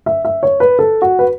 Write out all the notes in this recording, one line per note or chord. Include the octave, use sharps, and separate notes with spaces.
E5
E5
C#5
B4
A4
F#4
B4